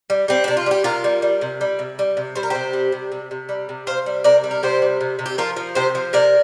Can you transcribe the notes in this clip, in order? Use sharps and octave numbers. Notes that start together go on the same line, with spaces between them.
G3
G3 C4
C3 D4
F4
G3 G4
C3 F4 A#4
G3
G3
C3
G3
C3
G3
C3
G3 C5
A#4
C3 G4 C5
G3
C3
C3
C3
G3
C3
C3 C5 F5
G3
C3 A#4 D5
G3
A#4
C3 G4 C5
G3
C3
C3
G4
F3 F4 A#4
F3
C3 G4 C5
F3
C3 A#4 D5